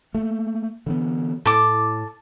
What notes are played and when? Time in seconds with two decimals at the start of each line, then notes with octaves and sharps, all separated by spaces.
0.14 A3 A#3
0.86 D3 E3 B3
1.46 A2 A4 D6